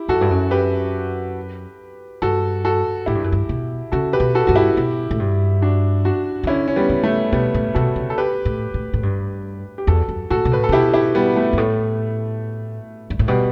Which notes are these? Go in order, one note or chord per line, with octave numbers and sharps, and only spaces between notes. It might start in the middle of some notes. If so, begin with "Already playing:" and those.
Already playing: E4 G4
F#2 F#4 A4
G2
F#2
G4 B4
G2 F#4 A4
F#4 A4
A2 E4 G4
G2
F#2
G2
B2
C#3 F#4 A4
G4 B4
B2
F#4 A4
G2 F#4
E4 G4
B2
A2
G2
D4 F#4
D4 F#4
E3
D3 C#4 E4
C#4
G3 B3
C#3
A3
B2 G3 B3
A2
B2 F#4 A4
C#3
A4
G4 B4
A2
A2
A2
G2
G4
E2 F#4 A4
F#2
A2 F#4 A4
B2
A2 B4
A4
C#3
B2 E4 G4
E4 G4
G3 B3
A3
G2
A2
G2
A2
B2 G3